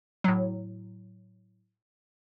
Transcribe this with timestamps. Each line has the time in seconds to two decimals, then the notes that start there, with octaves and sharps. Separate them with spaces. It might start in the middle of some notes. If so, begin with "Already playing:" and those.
0.24 A2 F#3